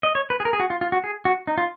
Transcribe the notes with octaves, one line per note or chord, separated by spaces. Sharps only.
D#5
C#5
B4
G#4
A#4
G#4
F#4
F4
F4
F#4
G#4
F#4
D#4
F4